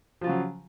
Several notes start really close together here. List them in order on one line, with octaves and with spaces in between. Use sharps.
F3 F4 C#3 F#3